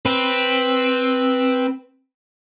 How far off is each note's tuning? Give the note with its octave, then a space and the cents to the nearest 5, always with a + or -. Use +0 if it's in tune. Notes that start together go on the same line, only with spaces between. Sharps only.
C4 +0 B4 +0